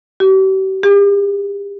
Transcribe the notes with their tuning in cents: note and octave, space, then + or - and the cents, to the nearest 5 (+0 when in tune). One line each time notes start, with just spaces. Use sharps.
G4 -40
G4 +40